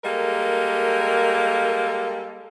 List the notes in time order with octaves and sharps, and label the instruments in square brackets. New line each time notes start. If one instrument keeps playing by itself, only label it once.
[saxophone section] G3 G#3 A#3 A4 A#4